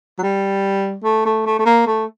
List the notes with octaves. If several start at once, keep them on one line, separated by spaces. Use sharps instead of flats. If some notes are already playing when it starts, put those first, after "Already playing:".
F#3
G3
A3
A3
A3
A3
A#3
A3